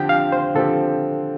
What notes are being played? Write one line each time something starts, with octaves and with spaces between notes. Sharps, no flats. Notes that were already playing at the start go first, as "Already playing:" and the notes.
Already playing: D3 F3 C4 G4 G5
F5
C5
D3 F3 C4 G4 A4